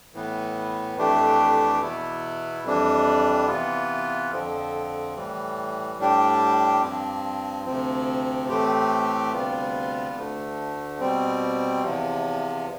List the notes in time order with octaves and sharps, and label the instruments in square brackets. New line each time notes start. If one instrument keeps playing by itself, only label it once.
[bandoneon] A2 E3 B3
F2 E3 A3 D4 G4
E2 B2 B3 E4
F2 E3 G3 D4
C3 E3 B3 F4
F2 D3 F3 C4
A2 E3 G3
A2 G3 D4 G4
G2 F3 C4
D2 C3 F3 C4
A2 E3 A3 C4 G4
D2 C3 G3 B3 F4
D2 D3 A3
B2 G3 C4
E2 C3 F3